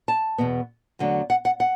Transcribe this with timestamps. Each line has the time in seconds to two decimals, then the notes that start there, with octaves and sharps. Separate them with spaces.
0.08 A5
0.38 E2 B2 B3
0.99 E2 D3 F#3 A3
1.30 F#5
1.45 F#5
1.60 F#5